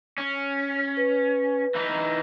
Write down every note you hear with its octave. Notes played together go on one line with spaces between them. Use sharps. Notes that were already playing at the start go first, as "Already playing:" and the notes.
C#4
B4
E3 D#4